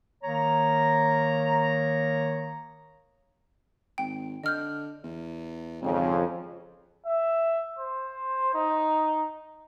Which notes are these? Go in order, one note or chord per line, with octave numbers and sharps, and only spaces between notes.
D#3 A#3 C#5 A#5
G#1 G5
D3 D#5 F6 G6
E2
G#1 F2 C#3
E5
C5
D#4